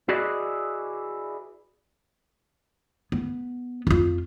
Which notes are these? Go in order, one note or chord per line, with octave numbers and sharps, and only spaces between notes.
E4 F#4 G#4 B4 D5 D#5
B3
F2 F4